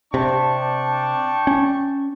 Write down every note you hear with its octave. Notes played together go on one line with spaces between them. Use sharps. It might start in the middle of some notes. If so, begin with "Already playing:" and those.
C3 D4 G5 A5 C#6
C#4